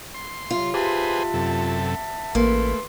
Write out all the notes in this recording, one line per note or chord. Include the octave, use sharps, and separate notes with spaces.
C6
C3 F#3 F4
G4 G#4 B4 C5 E5 F#5 A5
F#2 C3 A4
A1 A3 A#3 B4 C6